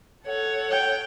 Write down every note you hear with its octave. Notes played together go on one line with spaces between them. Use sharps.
A4 C#5 F#5
G5